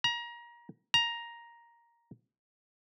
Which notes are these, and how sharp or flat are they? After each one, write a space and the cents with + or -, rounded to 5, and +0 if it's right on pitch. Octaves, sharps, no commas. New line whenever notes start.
A#5 +25
A#5 +5